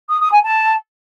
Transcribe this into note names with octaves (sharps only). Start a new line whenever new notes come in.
D#6
D#6
G#5
A5